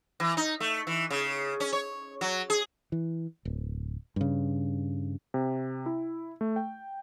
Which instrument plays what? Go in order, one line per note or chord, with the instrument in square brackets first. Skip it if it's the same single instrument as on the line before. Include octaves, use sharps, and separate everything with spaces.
[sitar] E3
D#4
A3
E3
C#3
C#4
C#5
F#3
G#4
[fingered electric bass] E3
D1
G2 C#3
[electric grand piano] C3
E4
A3
G5